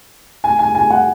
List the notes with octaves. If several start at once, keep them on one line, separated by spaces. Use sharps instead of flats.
G#5
G#5
G#5
F#5